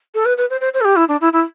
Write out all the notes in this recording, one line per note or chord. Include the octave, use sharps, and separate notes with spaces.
A4
B4
B4
C5
C5
C5
A4
G4
E4
D4
E4
E4